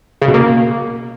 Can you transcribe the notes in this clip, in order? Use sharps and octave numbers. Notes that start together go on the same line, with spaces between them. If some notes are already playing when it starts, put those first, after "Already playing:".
C#3
B2
A#3